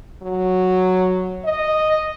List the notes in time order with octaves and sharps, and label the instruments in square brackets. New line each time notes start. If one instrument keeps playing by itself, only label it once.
[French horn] F#3
D#5